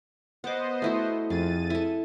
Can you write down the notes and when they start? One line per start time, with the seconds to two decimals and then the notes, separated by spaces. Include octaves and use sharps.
0.44 B3 C5 D#5 F#5 D6
0.82 A3 E4 F#4
1.30 F2 G#4 A6 D#7
1.70 E4 A4